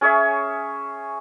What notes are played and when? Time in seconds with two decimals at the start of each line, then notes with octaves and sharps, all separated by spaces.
0.01 C#4 G#4 C#5 E5